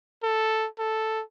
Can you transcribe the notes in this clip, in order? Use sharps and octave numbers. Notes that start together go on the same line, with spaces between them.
A4
A4